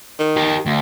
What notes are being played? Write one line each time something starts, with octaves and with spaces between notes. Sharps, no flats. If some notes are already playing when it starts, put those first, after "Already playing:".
D#3
G4 A#4
D2